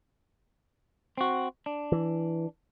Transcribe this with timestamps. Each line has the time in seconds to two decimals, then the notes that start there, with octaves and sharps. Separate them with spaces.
1.18 C4 F#4
1.66 D4
1.92 E3